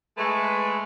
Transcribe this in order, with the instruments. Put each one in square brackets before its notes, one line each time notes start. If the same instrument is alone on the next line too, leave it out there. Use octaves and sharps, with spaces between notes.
[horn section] G#3 A3 B4